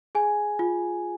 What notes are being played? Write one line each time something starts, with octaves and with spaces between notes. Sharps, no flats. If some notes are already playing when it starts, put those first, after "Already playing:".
G#4 G#5
F4